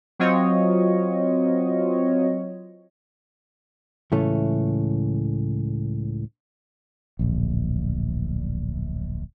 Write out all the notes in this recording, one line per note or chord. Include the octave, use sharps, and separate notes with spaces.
F#3 C4 F4 C#5 D#5
C#2 A2 E3 A3 C#4
D1 A#1